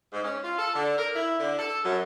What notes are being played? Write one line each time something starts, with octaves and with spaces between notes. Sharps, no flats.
G#2
C#4
F4
A4
D3
A#4
E4
D3
A4
F#2